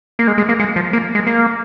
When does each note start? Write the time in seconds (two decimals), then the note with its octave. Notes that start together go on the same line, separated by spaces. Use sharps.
0.19 A#3
0.27 G#3
0.38 G#3
0.49 A#3
0.60 G#3
0.76 F3
0.93 A#3
1.15 G#3
1.27 A#3